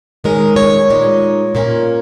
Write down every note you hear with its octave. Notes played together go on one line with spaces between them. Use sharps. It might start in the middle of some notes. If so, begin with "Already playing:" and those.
D#3 G#3 C#4 A#4
C#5
A#2 G#3 D#4
A#2 A#3 C#4